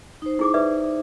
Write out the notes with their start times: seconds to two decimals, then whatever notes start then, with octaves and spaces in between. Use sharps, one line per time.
0.22 D#4 C5
0.39 E4 G#4 D6
0.54 B4 D5 E5